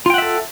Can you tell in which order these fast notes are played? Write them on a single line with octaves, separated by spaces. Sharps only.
F4 G5 F#5 E5 A4